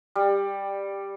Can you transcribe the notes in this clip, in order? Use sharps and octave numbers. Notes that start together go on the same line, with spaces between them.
G3